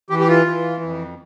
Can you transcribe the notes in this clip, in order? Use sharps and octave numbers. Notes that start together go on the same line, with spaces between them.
E3 G4
G4
F4
E3
F2